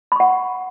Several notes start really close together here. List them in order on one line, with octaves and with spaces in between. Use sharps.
B5 C#6 F#5